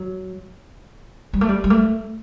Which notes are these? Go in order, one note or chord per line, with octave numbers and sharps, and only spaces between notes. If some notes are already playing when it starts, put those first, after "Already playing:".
Already playing: F#3
G3
A3
G3
G3
A3